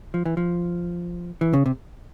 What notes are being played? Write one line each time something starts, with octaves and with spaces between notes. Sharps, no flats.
F3
E3
F3
E3
C#3
C3